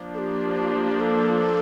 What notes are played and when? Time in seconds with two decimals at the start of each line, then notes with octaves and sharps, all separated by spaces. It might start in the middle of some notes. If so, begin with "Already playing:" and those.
Already playing: F3 A#3 D4
0.14 A4
0.19 G4
1.00 A4